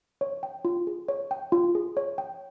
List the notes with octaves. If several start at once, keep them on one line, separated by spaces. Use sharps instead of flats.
C#5
G5
F4
G#4
C#5
G5
F4
G#4
C#5
G5